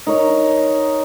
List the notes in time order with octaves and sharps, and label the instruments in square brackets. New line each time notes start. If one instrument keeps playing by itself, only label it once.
[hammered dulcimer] D#4 A#4 C#5